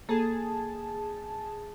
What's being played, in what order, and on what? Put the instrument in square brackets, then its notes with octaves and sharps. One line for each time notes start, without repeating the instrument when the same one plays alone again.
[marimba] A#3 A4 [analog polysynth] G#4 A5